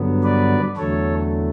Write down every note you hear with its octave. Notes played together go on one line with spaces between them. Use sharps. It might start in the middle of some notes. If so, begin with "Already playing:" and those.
Already playing: G2 D3 F#3 B3
B4 D5
E2 D3 F#3 A3 A4 C#5